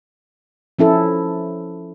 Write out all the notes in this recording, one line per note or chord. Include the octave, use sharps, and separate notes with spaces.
F3 C#4 E4 A4